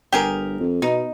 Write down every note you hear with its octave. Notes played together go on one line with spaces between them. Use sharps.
G1 G4 G#4 A#4
F2
B2 D#4